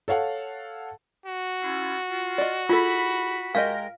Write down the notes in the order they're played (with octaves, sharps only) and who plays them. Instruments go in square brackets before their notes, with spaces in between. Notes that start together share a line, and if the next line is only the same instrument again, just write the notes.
[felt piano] A4 C#5 F5 F#5 A5
[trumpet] F#4
[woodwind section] C#4 E4 F4
F4
[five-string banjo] D5 D#5
[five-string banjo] E4 G#4 A4 [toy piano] F4 [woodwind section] B5
[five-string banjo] G#3 G4 D#5 [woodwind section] A#4 [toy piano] F5